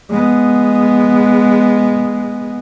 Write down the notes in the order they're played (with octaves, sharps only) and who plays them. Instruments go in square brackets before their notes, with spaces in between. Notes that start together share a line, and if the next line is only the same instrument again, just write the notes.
[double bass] G#3 B3